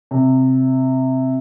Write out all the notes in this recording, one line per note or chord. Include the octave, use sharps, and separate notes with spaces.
C3